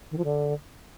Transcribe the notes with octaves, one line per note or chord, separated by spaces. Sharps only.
D#3
F3
D3